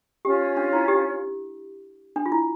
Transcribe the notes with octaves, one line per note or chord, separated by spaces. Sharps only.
C#4 F4 G4 C#5
D4
E4
G4
D4
F4
E4